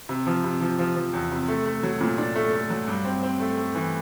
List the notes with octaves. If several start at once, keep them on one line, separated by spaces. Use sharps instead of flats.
C3
F3
C3
F3
F3
F3
E2
C3
A3
A3
F#3
A#2
D4
A3
A3
F#3
G2
C4
C4
A3
A3
E3